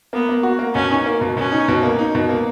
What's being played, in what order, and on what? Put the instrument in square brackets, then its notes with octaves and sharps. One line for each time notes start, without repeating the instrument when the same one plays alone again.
[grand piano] A#3 [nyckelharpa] B3
[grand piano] A#3
F#4
A#3
[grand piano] B2 [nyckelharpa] C#4
[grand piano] D#4
A#3
B2
[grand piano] B2 [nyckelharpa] C#4
[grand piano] D#4
B2
A#3
D#4
B2
A#3